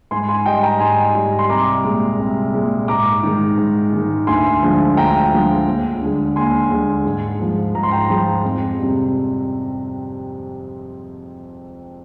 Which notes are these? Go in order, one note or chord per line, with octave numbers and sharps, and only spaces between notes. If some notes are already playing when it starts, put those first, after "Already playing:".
G#2 G#5 C6
G#5 C6
G3 D#5 G5
G5 A#5
G#2 G#5 C6
G3
C6
C2 A#5 D6
A#2 G#3
C2
A#2 G#3
G#2 A#5 D6
D#3 G#3
G#2
D#3 G#3
D2 G#5 C6
D3 F3 G#3
D2 G5 A#5
D3 F3 G#3
D#2
D3 G#3
D#2 G#5 C6
D3 G#3
G#2
F3 G#3
G#2 A#5
C6
G5 A#5
F3 G#3
F2
C3 G3